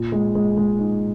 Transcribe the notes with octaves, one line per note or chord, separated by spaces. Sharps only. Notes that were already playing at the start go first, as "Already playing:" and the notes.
Already playing: A#2
G#3
G#3
G#3
D#4